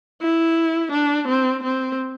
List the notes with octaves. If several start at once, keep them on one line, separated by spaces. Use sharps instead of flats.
E4
D4
C4
C4